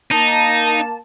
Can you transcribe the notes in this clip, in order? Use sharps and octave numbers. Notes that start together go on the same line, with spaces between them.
A#3 D#4 A5